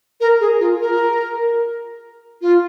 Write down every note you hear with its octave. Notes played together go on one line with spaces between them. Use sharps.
A#4
G#4
F4
A#4
F4